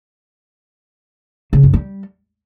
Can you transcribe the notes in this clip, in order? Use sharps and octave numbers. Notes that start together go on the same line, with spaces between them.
C#3
F#2
G3